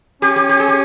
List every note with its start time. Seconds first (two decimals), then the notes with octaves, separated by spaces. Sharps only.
0.22 C#4 G4
0.36 G4
0.49 G4
0.60 G#4
0.68 G4